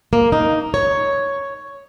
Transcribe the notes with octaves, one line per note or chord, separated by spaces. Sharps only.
A#3
D#4
C#5